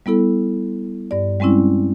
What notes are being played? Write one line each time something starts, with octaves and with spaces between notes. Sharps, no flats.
G3 B3 E4 A4
G2 D5
G3 G#3 C4 C#4 E4